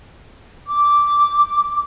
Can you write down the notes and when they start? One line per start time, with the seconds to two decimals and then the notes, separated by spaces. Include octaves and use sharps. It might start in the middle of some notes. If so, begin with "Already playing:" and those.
0.66 D6